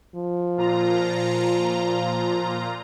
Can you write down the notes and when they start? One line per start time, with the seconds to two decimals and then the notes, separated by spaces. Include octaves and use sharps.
0.15 F3
0.57 A#2 F4 A#5